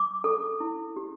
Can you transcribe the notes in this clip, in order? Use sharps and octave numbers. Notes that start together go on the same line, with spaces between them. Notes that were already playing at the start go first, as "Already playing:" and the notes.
Already playing: D6
A4
E4
G4